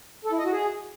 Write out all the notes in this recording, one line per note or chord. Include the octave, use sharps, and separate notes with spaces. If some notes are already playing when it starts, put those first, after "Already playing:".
A4
E4
D#5
F#4
G#4